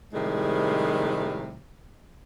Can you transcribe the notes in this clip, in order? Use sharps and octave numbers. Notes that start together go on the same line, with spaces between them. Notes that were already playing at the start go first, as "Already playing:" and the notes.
A2 C3 D#3 F3 G3 G#3